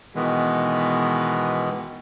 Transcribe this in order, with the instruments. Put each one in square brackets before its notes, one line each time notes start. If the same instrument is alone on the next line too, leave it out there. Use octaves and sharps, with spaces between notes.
[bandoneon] B2 D#3 E3 G#3 B3